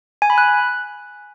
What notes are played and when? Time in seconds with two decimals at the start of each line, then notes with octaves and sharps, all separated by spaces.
0.22 G#5
0.30 B5
0.38 F#6